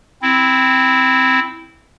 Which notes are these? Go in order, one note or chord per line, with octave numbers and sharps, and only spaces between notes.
C4 E4